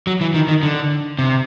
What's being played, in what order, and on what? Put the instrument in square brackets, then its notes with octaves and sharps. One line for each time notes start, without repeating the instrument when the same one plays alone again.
[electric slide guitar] F#3
E3
D#3
D#3
D3
C3